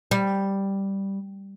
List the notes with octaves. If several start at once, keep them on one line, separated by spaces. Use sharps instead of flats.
G3